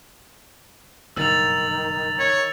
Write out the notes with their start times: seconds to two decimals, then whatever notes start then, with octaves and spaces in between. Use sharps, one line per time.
1.16 F#1 G2 B2 D#3 E6 A6 F7
2.19 C#5